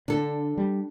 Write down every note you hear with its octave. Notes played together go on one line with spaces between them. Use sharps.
D3 D4 A4
G3